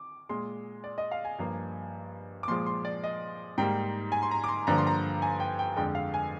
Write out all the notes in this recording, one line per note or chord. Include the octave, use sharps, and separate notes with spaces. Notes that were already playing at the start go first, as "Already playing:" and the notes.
Already playing: D6
A#2 G#3 C6
D5
D#5
F5
G#5
G2 F3 A#3
D6
A#2 F3 G#3 C6
C6
D5
D#5
G#2 G3 A#3 G5
G#5
C6
A#5
D6
C6
G2 D3 F3 A#3 A#5
C6
A#5
G#5
G5
G5
F2 D3 G#3 G5
F5
G#5